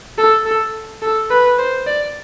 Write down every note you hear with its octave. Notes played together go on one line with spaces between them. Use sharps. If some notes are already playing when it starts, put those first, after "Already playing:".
A4
A4
A4
B4
C5
D5